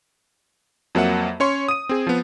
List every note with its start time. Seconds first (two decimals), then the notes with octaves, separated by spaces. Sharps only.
0.95 F2 F#3 A#3 E5 F#5
1.40 C#4 C#5 C6 C#6
1.68 D#6 D#7
1.89 C4 G#4
2.07 F3 B3